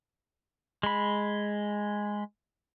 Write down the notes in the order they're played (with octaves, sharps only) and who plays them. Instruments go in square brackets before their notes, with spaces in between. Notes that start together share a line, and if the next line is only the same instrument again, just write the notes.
[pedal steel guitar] G#3 B5